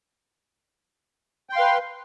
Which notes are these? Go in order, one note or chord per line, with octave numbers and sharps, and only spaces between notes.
B4 F5 G5 C6